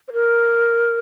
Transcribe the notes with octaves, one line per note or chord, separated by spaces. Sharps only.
C5
A#4